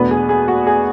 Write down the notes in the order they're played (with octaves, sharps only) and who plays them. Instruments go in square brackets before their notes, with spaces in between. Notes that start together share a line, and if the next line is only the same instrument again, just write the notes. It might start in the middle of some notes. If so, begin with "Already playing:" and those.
Already playing: [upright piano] E2 B2 A3 B3 D4 B4
G#4
G#4
F#4
G#4